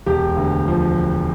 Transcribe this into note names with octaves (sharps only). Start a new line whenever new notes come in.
E1 G4
D2
F3